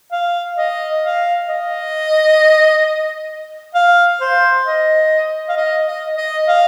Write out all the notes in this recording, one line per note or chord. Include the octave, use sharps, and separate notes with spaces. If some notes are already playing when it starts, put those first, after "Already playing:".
F5
D#5
F5
D#5
F5
C5
D#5
F5
D#5
D#5
D#5
F5